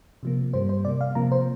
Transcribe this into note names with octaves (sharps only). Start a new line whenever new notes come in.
C3 F3 A#3
G2 G3 A#3 C5
C5
C3 A#3 D5
F5
C3 F3 A#3 A#5
C5